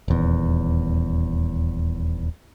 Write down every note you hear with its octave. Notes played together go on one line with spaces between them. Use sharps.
D#1 E2